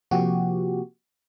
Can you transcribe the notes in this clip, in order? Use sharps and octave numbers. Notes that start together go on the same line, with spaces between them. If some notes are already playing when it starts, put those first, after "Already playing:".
C3 F3 A#3 F#4 G4